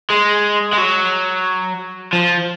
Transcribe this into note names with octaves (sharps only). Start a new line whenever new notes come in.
G#3
G#3
F#3
F3